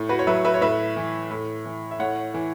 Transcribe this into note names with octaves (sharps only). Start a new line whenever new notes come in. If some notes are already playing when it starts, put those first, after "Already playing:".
Already playing: A2
F#4 B4
C#5
F#3 B4 E5
B4 E5
C#5
A2 B4 E5
E3
A2
E3
E5
A2 C#5 F#5
E3